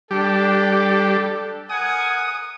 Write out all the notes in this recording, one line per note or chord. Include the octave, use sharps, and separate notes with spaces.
G3 D4 G4 A4
A#4 F#5 G#5 D#6